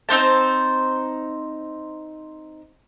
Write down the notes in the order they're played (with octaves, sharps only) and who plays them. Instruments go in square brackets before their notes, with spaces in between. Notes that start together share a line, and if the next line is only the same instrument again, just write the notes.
[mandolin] C4 D#4 C5 A5